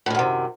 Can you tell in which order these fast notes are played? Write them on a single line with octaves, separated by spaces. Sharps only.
A2 D#3 F#2 C3